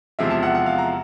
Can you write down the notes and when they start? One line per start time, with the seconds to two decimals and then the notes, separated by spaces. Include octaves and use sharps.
0.19 E2 C3 F3 G#3 E5
0.30 A5
0.43 F#5
0.55 F#5
0.66 F5
0.78 A#5